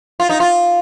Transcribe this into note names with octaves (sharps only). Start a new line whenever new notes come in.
F4
D#4
F4